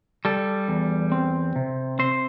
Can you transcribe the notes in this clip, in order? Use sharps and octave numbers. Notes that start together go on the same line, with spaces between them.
G3 A4
E2
C4
C3
C4 C5